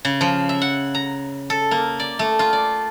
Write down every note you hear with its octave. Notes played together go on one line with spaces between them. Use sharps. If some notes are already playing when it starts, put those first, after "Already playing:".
C#3
F3
E5
F#5
A#5
A4
A#3
D5
A3
F4
D5